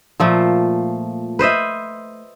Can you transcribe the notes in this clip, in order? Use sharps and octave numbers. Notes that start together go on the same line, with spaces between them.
A#2 F3 A3
B4 C5 D#5 E5